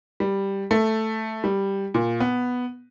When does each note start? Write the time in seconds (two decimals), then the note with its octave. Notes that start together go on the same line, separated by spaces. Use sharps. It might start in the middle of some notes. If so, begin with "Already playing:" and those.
0.20 G3
0.71 A3
1.44 G3
1.94 A#2
2.20 B3